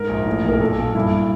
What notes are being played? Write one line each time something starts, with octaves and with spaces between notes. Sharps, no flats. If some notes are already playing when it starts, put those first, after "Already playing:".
Already playing: G#2 A#4
A#1
A2
B1 A#4
A#2 A4
A#2
G2 E4